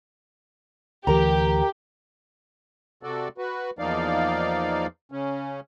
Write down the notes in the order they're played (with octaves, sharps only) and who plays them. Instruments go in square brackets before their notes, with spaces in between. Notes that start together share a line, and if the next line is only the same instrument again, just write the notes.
[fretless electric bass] D2 E3 [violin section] G4 [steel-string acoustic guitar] A#4 A#5
[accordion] C3 F#4 A4 D5
F#4 B4
E2 F3 A#3 D#4 D5 F5
C#3 C#4